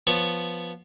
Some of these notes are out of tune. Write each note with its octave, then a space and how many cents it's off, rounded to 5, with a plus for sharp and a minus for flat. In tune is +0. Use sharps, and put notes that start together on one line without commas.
F3 +0 B3 +0 C#5 +0